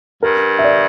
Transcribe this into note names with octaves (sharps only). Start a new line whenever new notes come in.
G2 A#4
E5
D5